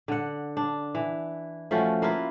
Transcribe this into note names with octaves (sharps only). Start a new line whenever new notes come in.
D3 F#5
D4
E3
F3 A3 C#4 F#4
A#3 E4 F4 B4